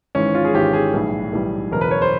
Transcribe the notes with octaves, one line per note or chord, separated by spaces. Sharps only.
G#1 G#2 E3 C#4
F4
G#4
G#1 G#2 E3 G4
G#4
B1 A2 E3 G3
B1 A2 E3 G3
F#1 E2 B2 A#4
B4
C#5
C5